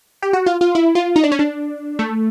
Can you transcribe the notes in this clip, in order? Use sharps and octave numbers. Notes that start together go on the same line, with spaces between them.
G4
F#4
F4
F4
E4
F4
D#4
D4
C#4
D4
A3